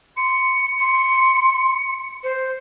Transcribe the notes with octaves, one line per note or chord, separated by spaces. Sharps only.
C6 C#7
C6
C5